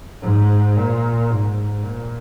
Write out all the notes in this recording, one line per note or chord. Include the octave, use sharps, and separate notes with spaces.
G#2
A#2
G#2
A#2